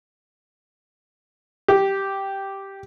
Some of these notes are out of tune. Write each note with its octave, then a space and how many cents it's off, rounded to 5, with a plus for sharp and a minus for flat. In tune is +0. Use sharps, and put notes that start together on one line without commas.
G4 -5